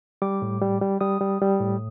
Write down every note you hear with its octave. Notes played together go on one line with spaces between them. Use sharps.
G3 D6
A2
G3
G3
G3 D#6
G3
G3
A2